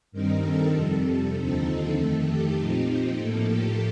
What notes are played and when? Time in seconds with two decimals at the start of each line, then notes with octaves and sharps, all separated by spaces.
0.12 G2 D#3 G3 C4 D#4 A#4
0.42 A4
0.73 F2 C3 G3
1.34 D#2 D3 F3 C4 D#4 A4
1.95 F2 D#3 A3
2.25 G4
2.56 A#2 F3 C4 D#4 G4
2.87 G4
3.17 A2 F3 A#3 A4
3.47 G4